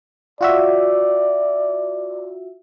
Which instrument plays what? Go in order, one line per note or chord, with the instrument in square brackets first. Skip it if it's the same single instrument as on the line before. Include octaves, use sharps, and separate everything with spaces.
[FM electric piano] F4 F#4 E5 [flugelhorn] D5